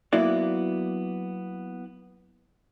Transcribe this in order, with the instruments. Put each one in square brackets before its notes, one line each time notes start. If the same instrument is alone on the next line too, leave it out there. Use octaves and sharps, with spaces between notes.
[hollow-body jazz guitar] F#3 A#3 B3 E4 F#4 D5